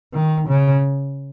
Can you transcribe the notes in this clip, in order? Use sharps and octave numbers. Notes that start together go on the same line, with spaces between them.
D#3
C#3